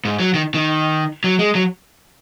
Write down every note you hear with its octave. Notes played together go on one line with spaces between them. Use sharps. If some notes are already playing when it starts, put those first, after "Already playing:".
G#2
F#3
D#3
D#3
F#3
G#3
F#3